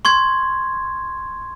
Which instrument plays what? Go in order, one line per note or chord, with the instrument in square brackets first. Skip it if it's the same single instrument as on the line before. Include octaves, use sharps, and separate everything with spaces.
[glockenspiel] C6 C#6 G#6